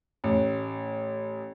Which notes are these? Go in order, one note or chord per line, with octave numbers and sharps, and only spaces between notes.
A1